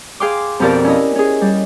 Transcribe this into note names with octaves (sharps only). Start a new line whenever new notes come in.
G#4 F5 G5 C6 D6
F2 B2 F3 G4 A#4 D5
C#4 E4 D#5
C#4 G#4
G3